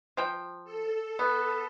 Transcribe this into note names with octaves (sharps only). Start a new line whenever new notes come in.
F3 G5
A4
B3